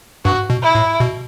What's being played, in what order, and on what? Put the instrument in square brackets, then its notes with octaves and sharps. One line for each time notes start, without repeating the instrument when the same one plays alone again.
[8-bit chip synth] G2 [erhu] F#4
[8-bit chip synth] B2
[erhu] E4
[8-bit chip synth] A2
B2